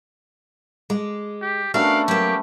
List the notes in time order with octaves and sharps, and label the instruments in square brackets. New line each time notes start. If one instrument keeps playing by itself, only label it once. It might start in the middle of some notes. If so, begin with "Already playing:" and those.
[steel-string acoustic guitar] G#3 [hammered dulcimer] D6
[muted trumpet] G4
[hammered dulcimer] A3 B3 C#4 [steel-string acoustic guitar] D4 F#4 A#4 [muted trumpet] F5
[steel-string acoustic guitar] F#3 A#3 [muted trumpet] G4